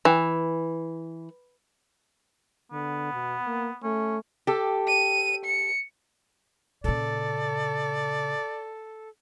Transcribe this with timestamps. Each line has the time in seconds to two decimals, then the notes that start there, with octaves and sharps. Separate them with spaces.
0.05 E3
2.72 D3 B3
3.13 B2
3.46 A#3
3.83 A3 C#4
4.47 G4 A4
4.87 D#7
5.44 C#7
6.84 A#2 C#3 A4 D5